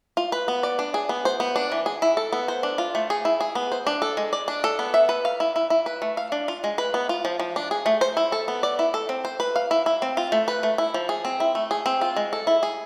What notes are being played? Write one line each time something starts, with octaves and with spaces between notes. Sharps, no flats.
F4
B4
B3
D5
D4
G#4
B3
C5
B3
D4
E3
G#4
E4
A4
B3
C5
D4
F4
A3
G#4
E4
G#4
B3
C5
D4
A4
G#3
D5
D4
A4
B3
E5
B4
F5
E4
E4
E4
B4
A3
F5
D4
F4
G#3
B4
B3
F4
F3
F3
D4
G#4
A3
C5
E4
A4
B3
D5
E4
A4
C4
C5
B4
F5
E4
E4
C4
F4
A3
B4
A3
E4
F3
G#4
C4
E4
A3
G#4
C4
F4
G#3
A4
E4
G#4